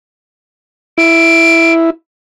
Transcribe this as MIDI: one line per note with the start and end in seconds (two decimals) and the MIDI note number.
0.98 1.90 64
0.98 1.73 98